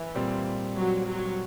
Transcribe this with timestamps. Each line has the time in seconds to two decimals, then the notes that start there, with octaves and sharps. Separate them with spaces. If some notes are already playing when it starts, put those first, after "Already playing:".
Already playing: E3
0.15 A#2 G3 C4
0.76 F#3
1.07 F#3